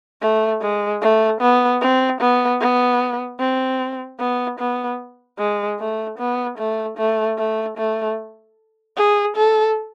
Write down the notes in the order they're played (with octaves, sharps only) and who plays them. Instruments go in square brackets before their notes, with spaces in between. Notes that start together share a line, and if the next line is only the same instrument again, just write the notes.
[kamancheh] A3
G#3
A3
B3
C4
B3
B3
C4
B3
B3
G#3
A3
B3
A3
A3
A3
A3
G#4
A4